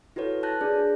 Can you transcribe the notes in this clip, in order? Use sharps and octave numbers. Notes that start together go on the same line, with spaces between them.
E4 F#4 A4 B4 C#5
B4 A5 F#6 G6 A#6
D4 G#4 D5